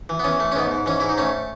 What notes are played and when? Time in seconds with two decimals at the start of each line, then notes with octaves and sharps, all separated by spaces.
0.09 E3
0.20 B3
0.24 E3 C#4
0.40 A3
0.52 C#4
0.56 G#2 B3
0.71 G#2
0.86 E3 C#4
1.00 G#2 E4
1.09 D#4
1.18 A3 C#4